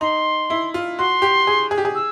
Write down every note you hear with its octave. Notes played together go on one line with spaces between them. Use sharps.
D#4 C6
E4
F4
F#4 C6
G4
G#4
G#4
G4
G#4
E6